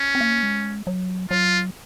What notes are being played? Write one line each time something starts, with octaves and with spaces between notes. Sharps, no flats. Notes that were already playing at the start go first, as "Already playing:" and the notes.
Already playing: C#4
C4
A#3
G#3
F#3
F#3 F4